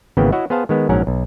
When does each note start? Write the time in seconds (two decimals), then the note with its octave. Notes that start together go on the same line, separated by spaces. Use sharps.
0.17 G#1 C#3 E3 A#3 B3 G5
0.32 E4 F#4 C#5 D#5 E5 F#5
0.50 B3 G#4 C5 F5 A5
0.69 D#3 G#3 B3
0.89 A#1 G#2 F#3 C#4 A#4 F#5
1.07 B1